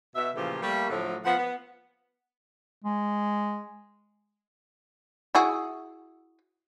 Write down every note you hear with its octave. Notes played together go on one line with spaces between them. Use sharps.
B2 E5
A#2 C#3 E3 F3 A3 G4
G3 A3 A#3
A2 D3 F3 F#3 A3
F3 B3 F#5
B3
G#3
E4 F#4 G#4